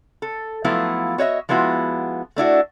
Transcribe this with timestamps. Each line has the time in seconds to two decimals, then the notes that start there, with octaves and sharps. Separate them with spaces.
0.22 A4
0.64 F3 F#3 A3 B3 E4 F4
1.18 F#4 C#5 D#5 E5
1.49 F3 G#3 B3 E4 F#4
2.36 A3 D4 E4 F#4